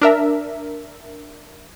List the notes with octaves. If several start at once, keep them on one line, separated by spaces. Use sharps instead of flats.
D4 A#4 E5